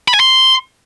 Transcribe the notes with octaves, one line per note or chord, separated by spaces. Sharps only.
B5
G#5
C6